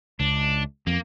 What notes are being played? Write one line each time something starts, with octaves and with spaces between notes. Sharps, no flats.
C#2 D4
F2 A#3